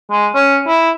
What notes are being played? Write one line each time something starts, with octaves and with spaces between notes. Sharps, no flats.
G#3
C#4
E4